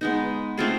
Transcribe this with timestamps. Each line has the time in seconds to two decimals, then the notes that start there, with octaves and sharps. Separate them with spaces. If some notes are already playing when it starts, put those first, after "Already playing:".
0.01 G#3 B3 D#4
0.58 A3 C4 F4 G#4